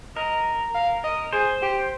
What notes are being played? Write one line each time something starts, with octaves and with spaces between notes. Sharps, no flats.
A#4 D#5
F5
D#5
G#4 C5
G4